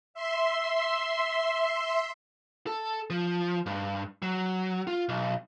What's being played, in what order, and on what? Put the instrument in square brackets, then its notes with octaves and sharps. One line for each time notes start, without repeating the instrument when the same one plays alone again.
[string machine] E5 C6
[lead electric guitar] A4
F3
G2
F#3
F4
B1